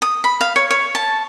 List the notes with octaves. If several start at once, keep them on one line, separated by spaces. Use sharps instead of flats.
D#6
B5
F5
C#5
C#5
A5